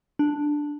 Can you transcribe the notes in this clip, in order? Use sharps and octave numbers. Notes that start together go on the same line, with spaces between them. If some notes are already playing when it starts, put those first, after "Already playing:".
D4